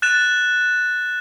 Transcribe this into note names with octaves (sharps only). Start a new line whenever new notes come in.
F#6 A6 E7